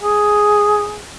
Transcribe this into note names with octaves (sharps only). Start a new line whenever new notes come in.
G#4